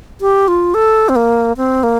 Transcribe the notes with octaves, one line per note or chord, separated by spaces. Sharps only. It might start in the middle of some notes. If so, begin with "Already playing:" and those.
G4
F4
A4
C4
A#3
C4
A#3